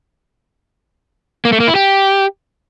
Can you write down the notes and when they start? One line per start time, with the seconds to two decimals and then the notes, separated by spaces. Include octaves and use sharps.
1.45 A#3
1.53 A3
1.60 A#3
1.68 E4
1.75 G4